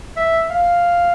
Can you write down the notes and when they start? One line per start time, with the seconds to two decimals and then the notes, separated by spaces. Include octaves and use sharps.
0.17 E5
0.50 F5